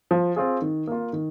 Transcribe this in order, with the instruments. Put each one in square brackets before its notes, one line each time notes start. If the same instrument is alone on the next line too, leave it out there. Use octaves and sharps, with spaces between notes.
[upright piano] F3
C4 F4 G#4
D#3
A#3 F4
D#3